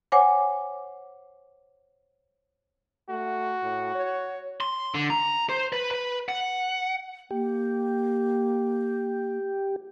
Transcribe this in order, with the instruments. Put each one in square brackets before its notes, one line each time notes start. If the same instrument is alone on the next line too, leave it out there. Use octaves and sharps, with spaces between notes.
[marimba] C5 C#5 F#5 G#5 D6
[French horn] A3 [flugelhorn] F#4
[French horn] A2
C#5
[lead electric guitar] C6
D3
A#5
C5
B4
B4
F#5
[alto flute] A#3 [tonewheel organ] G4